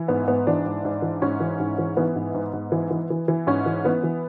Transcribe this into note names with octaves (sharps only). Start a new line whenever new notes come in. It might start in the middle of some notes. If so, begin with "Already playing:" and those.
Already playing: E3
G#2 B3
G#2 B3
E3 D4
G#2
G#2
E3
G#2 C#4
E3
G#2
E3
E3 B3
G#2
G#2
G#2
E3
E3
E3
E3
G#2 C#4
E3
E3 B3
E3